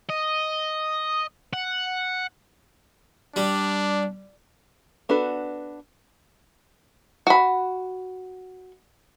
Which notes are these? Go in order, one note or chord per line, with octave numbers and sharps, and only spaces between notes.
D#5
F#5
G3 D4
B3 D4 F#4 A4 B4
F#4 B5